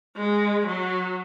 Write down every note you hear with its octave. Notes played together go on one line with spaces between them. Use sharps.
G#3
F#3